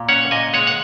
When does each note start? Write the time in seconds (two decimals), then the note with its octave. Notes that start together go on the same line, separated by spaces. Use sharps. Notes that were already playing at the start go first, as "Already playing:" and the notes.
Already playing: A#2
0.09 C#4 C#5 F#5
0.31 A#2 D#5 G#5
0.53 G#3 C#5 F#5
0.67 F#5